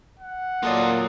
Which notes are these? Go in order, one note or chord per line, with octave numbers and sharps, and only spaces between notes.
F#5
A#2 F#3 A#3 F4 A4 D5 D#5